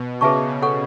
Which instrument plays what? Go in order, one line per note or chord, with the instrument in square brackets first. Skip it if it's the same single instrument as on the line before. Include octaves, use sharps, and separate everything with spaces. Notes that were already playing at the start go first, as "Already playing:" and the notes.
Already playing: [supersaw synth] B2
[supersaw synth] C#3 [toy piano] G#4 B4 E5 A5 C#6
[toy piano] A4 C#5 F#5 C#6